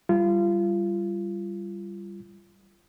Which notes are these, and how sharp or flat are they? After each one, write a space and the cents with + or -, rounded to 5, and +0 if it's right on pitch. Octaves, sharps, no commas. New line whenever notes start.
G3 +0 F4 -30